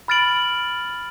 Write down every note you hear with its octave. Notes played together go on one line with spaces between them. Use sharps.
B5 F6 A6 D7 F#7